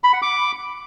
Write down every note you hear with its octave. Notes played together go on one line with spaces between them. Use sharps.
B5
F#5
D6